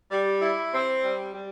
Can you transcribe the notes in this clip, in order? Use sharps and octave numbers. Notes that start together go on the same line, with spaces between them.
G3
E4
C4
G3
G3